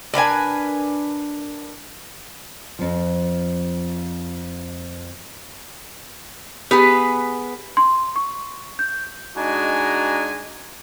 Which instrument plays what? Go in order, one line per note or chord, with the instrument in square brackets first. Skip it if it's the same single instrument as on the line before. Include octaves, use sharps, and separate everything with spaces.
[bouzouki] D4 A#4 B4 G#5
[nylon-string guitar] F2 F3
[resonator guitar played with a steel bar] B3 G#4 B4 [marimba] G4
[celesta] C6
C#6
G6
[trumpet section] G#3 D4 D#4 F#4 G#5 A#5